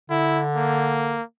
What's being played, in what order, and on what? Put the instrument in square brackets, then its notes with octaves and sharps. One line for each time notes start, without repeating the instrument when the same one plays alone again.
[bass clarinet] D3 [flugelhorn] E4
[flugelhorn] A#3